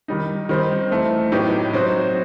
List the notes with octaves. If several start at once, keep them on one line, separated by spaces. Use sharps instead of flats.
D#3 G3 D#4
D#3 G3 C4 D#4
E3 A3 C4
A2 F#3 B3 D#4 G4
F#3 C4 D#4 F#4